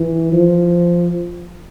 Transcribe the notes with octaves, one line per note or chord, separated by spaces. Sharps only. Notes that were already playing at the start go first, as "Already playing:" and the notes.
Already playing: E3
F3